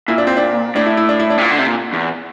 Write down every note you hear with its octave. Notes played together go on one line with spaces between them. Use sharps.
A#2 E4
D4
C4
D4
A2 D4
E4
E4
D4
E4
D4
C3
A#2
D3
C3
A#2
E2